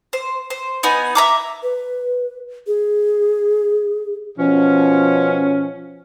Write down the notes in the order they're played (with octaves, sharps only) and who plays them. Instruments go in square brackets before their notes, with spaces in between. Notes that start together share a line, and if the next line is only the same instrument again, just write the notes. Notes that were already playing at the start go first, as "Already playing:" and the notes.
[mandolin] C5
C5
B3 D#4 F#5 G#5
E5 A#5 D6
[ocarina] B4
G#4
[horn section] B2 F3 C#4